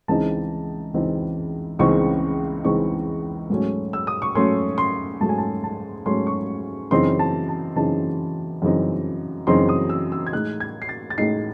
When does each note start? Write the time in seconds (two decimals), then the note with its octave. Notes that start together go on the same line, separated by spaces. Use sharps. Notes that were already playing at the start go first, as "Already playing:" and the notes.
0.08 C#2 C#3 E3 C4 D#4 A5
0.94 C#2 C#3 E3 C4 D#4
1.79 C#2 C#3 E3 C4 D#4 C#6
2.64 C#2 C#3 E3 C4 D#4 C#6
3.50 G#2 F#3 A3 C#4
3.93 E6
4.07 D#6
4.22 C#6
4.35 G#2 F#3 A3 C#4 C6
4.78 C6
5.21 G#2 F#3 A3 C#4 A5
5.29 G#5
5.38 A5
5.64 A5
6.06 G#2 F#3 A3 C#4 C6
6.27 C#6
6.91 F#2 C#3 E3 C4 D#4 C6
7.19 A5
7.49 A5
7.76 F#2 C#3 E3 C4 D#4 A5
8.62 F#2 C#3 E3 C4 D#4
9.47 F#2 C#3 E3 C4 D#4 C6
9.69 D#6
9.89 E6
10.12 E6
10.27 G#6
10.32 A2 G#3 D#4 F#6
10.60 G#6
10.82 C7
10.89 A6
11.10 A6
11.18 A2 G#3 D#4 C7